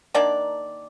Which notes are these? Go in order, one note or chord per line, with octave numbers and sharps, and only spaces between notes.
D#3 A#3 D4 D5